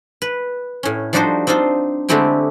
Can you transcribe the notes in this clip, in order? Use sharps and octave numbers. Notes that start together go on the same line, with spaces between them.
B4
A2 C#4
F3 G3 D4 D#4 F#4 C5
C4 D4 D#4 F4 C5
D3 G#3 A3 C4 E4 G4